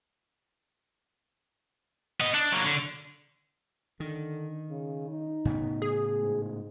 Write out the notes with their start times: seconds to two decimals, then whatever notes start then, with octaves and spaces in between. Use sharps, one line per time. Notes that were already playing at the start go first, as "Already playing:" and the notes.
2.20 B3 D#5
2.34 D4
2.52 F#3 A#3
2.64 D3
4.00 D3 D#3
4.70 C#3
5.09 D#4
5.45 A2 C#3 B3
5.82 G#4
6.20 G#2